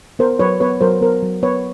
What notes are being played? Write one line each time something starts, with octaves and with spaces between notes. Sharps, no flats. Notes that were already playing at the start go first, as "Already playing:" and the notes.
B3 A#4 C5
F#3 B4 C#5
B3 B4 C#5
F#3 A#4 C5
B3 A#4 C5
F#3
B3 B4 C#5